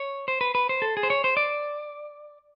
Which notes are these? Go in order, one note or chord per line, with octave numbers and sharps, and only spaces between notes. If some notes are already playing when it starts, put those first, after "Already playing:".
Already playing: C#5
C5
B4
B4
C5
A4
G#4
C5
C#5
C5
D5